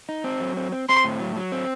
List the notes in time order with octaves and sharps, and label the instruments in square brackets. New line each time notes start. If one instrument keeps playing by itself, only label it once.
[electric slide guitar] D#4
C4
F#3
C4
C4
[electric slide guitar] C4 [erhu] C6
[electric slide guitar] A2
F#3
F#3
C4